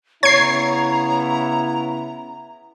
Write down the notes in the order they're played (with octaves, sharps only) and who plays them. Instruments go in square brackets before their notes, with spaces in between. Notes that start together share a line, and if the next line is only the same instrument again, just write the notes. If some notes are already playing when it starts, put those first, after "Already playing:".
[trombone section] C#3 B3 E4 [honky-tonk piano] C#5 [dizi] A#5 [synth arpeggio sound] G#6 C7